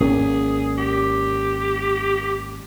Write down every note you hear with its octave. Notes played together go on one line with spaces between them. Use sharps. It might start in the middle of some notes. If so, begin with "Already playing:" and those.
G#1 A#3 C#4 G#4
G4